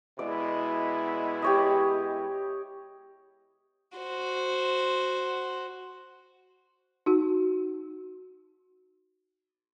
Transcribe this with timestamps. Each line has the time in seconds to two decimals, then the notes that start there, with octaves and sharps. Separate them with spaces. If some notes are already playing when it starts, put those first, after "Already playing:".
0.19 B2 G#3 E4 D5
1.42 G4 C#5 D#5
3.98 F#4 C5
7.06 D#4 F#4